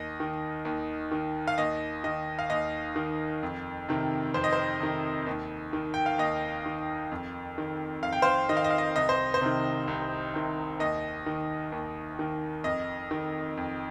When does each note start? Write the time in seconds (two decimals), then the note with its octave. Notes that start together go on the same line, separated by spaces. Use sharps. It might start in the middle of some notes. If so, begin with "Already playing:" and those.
Already playing: D#2 D#5
0.20 D#3
0.65 D#2
1.11 D#3
1.47 F5
1.58 D#2 D#5
2.04 D#3 D#5
2.39 F5
2.50 D#2 D#5
2.96 D#3
3.43 F2
3.89 C3 D#3
4.34 F2 C5
4.44 D#5
4.53 C5
4.80 C3 D#3
5.26 D#2
5.73 D#3
5.94 G5
6.06 F5
6.18 D#2 D#5
6.66 D#3
7.11 F2
7.58 D#3
8.03 F2 F5
8.13 G5
8.22 C5 F5
8.49 D#3 D#5
8.57 F5
8.64 D#5
8.70 F5
8.78 D#5
8.96 C2 D#5
9.09 C5
9.34 C5
9.41 C3 D#3
9.88 C2
10.34 C3 D#3
10.79 D#2 D#5
11.26 D#3
11.72 D#2
12.19 D#3
12.64 F2 D#5
13.11 D#3
13.57 F2